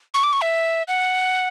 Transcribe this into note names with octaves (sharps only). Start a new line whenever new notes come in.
C#6
D6
C#6
E5
F#5